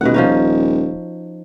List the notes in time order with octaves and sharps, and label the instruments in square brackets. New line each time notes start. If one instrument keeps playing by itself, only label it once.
[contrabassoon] D#1 [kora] B2 F#5
[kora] F3 C#4 D#4